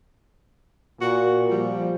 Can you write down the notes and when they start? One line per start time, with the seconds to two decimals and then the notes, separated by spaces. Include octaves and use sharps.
1.01 A#2 F#4
1.50 F3 G3